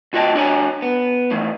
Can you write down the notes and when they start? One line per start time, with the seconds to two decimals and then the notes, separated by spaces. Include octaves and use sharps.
0.13 D2 F4 F#4 D#5 G5 A5
0.35 D4 F#4 C#5 F#5 G#5 A#5
0.82 B3
1.31 A2 D#3 E3